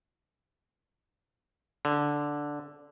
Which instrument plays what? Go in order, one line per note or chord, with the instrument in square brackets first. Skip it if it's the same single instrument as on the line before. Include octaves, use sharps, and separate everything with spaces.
[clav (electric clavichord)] D3